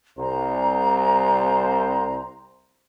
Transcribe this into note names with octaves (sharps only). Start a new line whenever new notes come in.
C2 C5 A#5